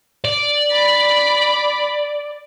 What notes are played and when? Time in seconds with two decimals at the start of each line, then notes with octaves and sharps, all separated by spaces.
0.25 D5
0.74 B5